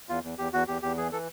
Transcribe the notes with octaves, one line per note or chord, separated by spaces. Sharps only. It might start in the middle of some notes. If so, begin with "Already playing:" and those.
E2 F4
E2
E2 G4
E2 F#4
E2 G4
E2 G4
E3 G#4
E3 A4